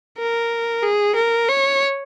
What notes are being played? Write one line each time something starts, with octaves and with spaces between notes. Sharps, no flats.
A#4
G#4
A#4
C#5